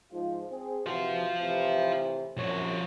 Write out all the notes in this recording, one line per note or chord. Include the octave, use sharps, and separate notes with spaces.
G#2 F3 F4
C4 G#4
C3 E3 F4 F#4 C5
A2 C3 E3
C2 F#2 F3 C#5